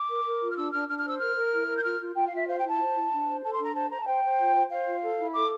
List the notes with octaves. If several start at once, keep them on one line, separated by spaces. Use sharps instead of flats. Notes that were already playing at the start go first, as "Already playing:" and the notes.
Already playing: D6
A#4
A#4
F4
F6
D4 E6
D4 F6
D4 F6
F6
C5 E6
A#4 F6
A#4
E4
A#4
G6
F4 F6
F4
F4 G5
F5
F4 E5
C5 F5
G5
E4
A5
C5
E4
D4
C5
A4 A5
C6
D4
A#5
C5 A5
C5 A#5
A5
C5 G5
C5
F4
C5
C5 F5
F4
A4
E4
A4 D6